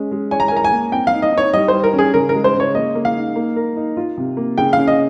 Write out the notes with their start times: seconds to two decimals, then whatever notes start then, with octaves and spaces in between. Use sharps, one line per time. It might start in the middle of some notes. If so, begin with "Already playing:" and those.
Already playing: G#3 C#4
0.12 G#3
0.31 C#5 G#5
0.40 A#5
0.48 G#5
0.52 A#4 A#5
0.64 G#5
0.71 A#3
0.92 C4 G5
1.07 F5
1.12 D#4
1.22 D#5
1.33 D#4 C#5
1.53 G3 D#5
1.68 G3 C5
1.84 A#4
1.93 C#4
1.99 G#4
2.14 C#3 A#4
2.29 A#4
2.34 G#3
2.44 C5
2.54 C#3
2.60 C#5
2.74 A#3 D#5
2.95 A#3
3.05 F5
3.15 D#4
3.36 A#3
3.56 A#4
3.76 D#4
3.97 F4
4.17 C3
4.37 A#3
4.58 C#3 G5
4.73 C#4 F5
4.88 D#5